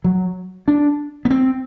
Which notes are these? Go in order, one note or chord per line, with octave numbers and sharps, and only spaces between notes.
F#3
D4
B3
C4